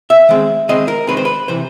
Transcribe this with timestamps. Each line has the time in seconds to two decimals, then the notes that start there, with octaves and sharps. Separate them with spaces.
0.10 E5
0.29 D#3 G#3 C4
0.69 D#3 G#3 C4 D#5
0.88 A#4
1.07 D#3 G#3 C4 B4
1.17 C5
1.25 B4
1.48 C3 E3 C5